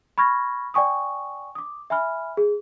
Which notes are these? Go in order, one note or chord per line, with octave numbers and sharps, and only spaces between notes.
B5 C#6 F6 G#6 A#6
D5 G5 G#5 C#6 D#6
D6 D#6
E5 G#5 B5 F6
G#4